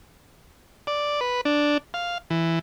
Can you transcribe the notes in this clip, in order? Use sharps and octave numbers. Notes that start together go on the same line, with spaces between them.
D5
B4
D4
F5
E3